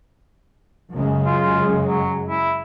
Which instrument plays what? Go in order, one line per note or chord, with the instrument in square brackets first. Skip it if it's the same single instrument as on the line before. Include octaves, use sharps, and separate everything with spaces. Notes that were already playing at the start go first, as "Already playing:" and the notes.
[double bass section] F#2 C#3 G#3
[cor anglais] F4
F#3
E4